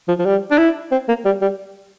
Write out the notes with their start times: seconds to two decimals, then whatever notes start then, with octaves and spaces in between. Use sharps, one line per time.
0.08 F3
0.19 F3
0.25 G3
0.51 D4
0.58 E4
0.91 C4
1.08 A#3
1.25 G3
1.42 G3